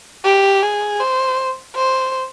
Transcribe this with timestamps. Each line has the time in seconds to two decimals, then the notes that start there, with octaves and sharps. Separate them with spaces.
0.25 G4
0.62 G#4
1.00 C5
1.76 C5